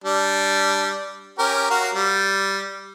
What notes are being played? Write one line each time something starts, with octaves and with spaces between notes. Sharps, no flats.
G3 D4
C#4 G4 A#4
F#4 A#4 F5
G3